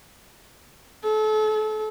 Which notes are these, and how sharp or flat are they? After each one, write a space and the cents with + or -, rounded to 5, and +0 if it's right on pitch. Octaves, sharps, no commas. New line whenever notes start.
A4 -35